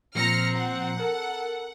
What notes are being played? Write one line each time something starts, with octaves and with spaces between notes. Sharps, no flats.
A#2 F3 C4 A#5 F6 A#6 C#7
F#5
A4 A#4